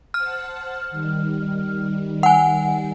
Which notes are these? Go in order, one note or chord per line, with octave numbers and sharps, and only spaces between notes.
C5 F#5 A5 F6
D#3 G3
F#5 G#5